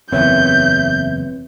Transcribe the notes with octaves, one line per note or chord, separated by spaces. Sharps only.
F#1 E2 C4 B4 C#5 E5 G6